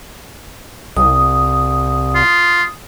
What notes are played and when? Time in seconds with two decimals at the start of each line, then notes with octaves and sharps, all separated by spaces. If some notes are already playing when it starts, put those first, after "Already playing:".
0.97 C2 D#6
2.15 F4